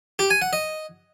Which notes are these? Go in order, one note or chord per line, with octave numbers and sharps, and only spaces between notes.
G4
G#5
F#5
D#5